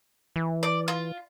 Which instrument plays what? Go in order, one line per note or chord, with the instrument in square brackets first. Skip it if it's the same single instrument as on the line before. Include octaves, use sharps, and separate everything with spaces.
[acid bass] E3
[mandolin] D5
F4